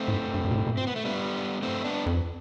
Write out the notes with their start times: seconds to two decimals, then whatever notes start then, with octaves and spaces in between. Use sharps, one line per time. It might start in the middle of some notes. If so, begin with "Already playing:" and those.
Already playing: A3 C4
0.08 A2
0.13 G2
0.34 G2
0.45 G2
0.51 B2
0.55 A2
0.67 B2
0.73 A2
0.77 G2 C4
0.87 B3
0.96 A3
1.05 G3 B3
1.62 A3 C4
1.84 B3 D4
2.06 F2